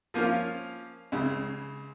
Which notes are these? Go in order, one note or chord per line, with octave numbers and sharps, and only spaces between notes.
F3 A#3 C#4 F4
C#2 C#3